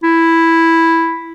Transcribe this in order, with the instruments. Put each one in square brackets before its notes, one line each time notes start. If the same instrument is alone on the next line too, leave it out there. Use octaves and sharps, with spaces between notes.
[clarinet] E4